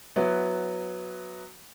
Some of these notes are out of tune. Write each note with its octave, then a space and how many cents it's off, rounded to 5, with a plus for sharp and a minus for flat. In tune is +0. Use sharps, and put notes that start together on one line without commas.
F#3 -10 B3 +0 E4 +0